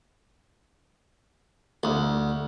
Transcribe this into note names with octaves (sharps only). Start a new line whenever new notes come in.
D2